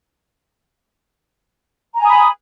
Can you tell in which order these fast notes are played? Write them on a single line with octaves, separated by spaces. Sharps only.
A#5 G#5 D#6 B5